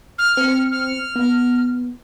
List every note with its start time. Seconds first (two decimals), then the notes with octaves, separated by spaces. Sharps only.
0.18 F6
0.37 C4 C#7
0.72 F6
1.16 B3